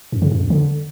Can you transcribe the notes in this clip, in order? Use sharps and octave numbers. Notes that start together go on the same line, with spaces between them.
F#2
C#3
F#2
E2
D3